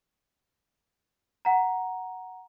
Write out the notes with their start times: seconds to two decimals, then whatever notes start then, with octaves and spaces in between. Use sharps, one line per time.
1.45 F#5 A#5